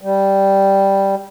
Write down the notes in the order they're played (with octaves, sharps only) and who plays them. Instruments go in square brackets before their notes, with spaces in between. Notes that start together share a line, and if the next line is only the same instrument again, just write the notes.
[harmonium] G3